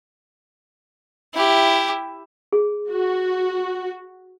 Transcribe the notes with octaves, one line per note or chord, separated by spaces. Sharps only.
E4 G4
G#4
F#4